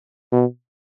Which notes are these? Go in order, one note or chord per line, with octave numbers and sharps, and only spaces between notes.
B2